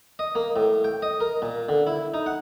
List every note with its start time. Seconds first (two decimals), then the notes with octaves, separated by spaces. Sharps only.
0.19 D#5
0.35 A#3
0.56 A2
0.84 G5
1.02 D#5
1.21 A#4
1.42 A#2
1.69 D3
1.87 E4
2.14 D#4
2.26 F#5